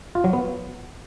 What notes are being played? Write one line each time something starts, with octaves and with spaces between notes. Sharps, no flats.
F4
F#3
B3